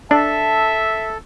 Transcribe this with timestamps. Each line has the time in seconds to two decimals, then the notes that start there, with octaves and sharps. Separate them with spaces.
0.11 D4 A4 E5 A5